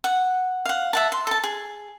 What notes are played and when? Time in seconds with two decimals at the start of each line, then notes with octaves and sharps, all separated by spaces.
0.04 F#5
0.65 F5 F#5
0.93 E5 F#5 A5
1.12 C6
1.27 A4 A5
1.44 G#4